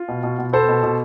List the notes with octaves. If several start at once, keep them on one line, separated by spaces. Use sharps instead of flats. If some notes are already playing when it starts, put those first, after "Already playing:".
Already playing: F4
B2
B2
B2
B3 A4 C5
B2
B2